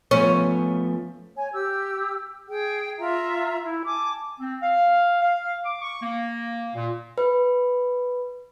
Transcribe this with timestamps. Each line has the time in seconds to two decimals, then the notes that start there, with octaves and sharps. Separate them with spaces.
0.11 F3 A3 B3 C#4
1.36 C#5 G#5
1.53 G4 E6
2.49 G#4 G5
3.00 F4 E5 A#5
3.65 E4
3.86 G#5 A5 D6
4.40 C4
4.62 F5
5.22 F5
5.65 D6
5.81 C#6
6.02 A#3
6.74 A#2
7.18 B4